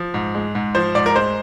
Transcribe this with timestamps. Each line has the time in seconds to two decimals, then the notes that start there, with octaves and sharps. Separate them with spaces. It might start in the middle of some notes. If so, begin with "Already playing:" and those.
Already playing: F3
0.14 G#2
0.35 G#3
0.55 G#2
0.75 F3 C5
0.95 G#2 D5
1.06 A#4
1.16 G#3 C5